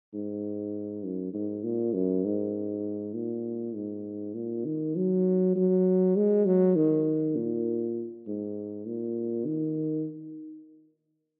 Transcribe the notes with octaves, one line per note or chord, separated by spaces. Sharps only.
G#2
F#2
G#2
A#2
F#2
G#2
A#2
G#2
A#2
D#3
F#3
F#3
G#3
F#3
D#3
A#2
G#2
A#2
D#3